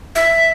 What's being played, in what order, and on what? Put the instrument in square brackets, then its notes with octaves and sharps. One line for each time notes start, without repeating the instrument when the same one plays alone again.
[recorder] E5